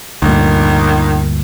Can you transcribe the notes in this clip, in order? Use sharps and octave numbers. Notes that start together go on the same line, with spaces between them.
D2 G2 A#2 D#3